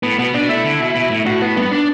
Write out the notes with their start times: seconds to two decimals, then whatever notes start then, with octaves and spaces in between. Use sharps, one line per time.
0.03 A2 B3
0.19 B2 B3
0.34 B2 D4
0.49 A3 E4
0.64 D3
0.80 B2
0.95 B2
1.10 A2
1.26 A2 F#4
1.42 B3
1.56 G2 B3
1.72 D4